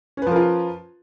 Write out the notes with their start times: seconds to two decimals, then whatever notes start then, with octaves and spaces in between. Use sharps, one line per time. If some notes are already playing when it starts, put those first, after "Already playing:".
0.17 C#4
0.22 B4
0.27 F3
0.31 A#4
0.36 F4